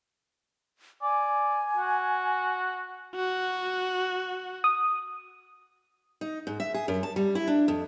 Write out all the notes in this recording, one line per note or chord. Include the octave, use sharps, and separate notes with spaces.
D5 G#5
F#4
F#4
D#6
D#4
G#2
E5
G#4
F#2
A5
G3
E4
D4
F2